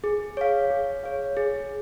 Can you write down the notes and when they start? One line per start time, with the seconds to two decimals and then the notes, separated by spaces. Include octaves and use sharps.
0.04 G#4
0.37 C#5 F5
0.71 G#4
1.04 C#5 F5
1.37 G#4